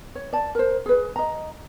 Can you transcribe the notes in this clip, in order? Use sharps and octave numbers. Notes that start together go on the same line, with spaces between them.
C#5
D5 A5
A#4 C5
G#4 B4
D#5 A#5